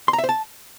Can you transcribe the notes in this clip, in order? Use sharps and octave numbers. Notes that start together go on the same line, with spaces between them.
C6
A#5
E5
C5
A5